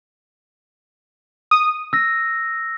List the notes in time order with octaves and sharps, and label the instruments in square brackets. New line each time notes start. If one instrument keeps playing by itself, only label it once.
[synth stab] D#6
[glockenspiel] E6 A#6